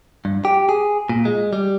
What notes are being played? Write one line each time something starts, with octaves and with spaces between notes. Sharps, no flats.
G2
G4
G#4
A#2
G#3
G3